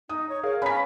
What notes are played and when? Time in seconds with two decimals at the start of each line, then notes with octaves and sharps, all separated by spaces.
0.09 D#4 D#6
0.29 C#5
0.43 G#4 A#4 C#5 F5
0.62 C#4 B4 F5 A#5 B5 B6